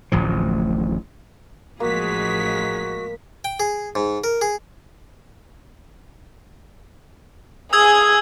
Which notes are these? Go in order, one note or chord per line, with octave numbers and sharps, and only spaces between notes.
D1 A1 F3
A1 F3 G#3 A#3 F#4 G#4 B6
G5
G#4
G#2
A#4
G#4
G#4 G#5 D#6 E6 G#6